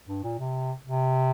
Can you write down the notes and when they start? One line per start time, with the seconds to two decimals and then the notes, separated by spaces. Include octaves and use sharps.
0.08 G2
0.23 A#2
0.39 C3
0.86 C3